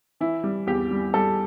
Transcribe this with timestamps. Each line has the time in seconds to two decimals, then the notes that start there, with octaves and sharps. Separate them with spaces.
0.20 E3 E4
0.44 G3
0.67 E2 G4
0.91 G3
1.14 G3 A4